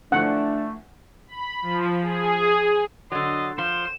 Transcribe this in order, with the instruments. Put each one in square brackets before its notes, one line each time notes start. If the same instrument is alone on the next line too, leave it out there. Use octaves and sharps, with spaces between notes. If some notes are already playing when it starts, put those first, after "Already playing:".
[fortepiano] D3 E3 F3 [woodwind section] A3 [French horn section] D4 [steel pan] F#5
[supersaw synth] B5
F3
G#4
[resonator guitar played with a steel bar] D3 F#3 [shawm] D#5 [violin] C6 A6
[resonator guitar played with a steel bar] F3 [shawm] C5 [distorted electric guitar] C6 [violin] E7